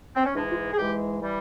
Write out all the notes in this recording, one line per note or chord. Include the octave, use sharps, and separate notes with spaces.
C4
C#4
G#2 E3 G#3 D4
F4
G#4
G#2 E3 G#3 G4
E3 G3